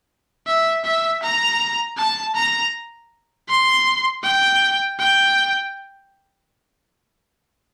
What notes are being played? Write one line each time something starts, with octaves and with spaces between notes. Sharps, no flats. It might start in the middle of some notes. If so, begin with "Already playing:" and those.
E5
E5
A#5
A5
A#5
C6
G5
G5